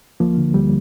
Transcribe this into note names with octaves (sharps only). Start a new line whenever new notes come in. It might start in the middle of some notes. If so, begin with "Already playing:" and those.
D2 F3 A#3
D3
D2 G3